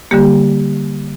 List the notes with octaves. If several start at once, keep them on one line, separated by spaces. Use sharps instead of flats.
D3 G3 A#3 G4